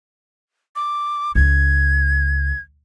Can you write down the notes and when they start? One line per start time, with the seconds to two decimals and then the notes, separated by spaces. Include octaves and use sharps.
0.76 D6
1.35 C#2 G#6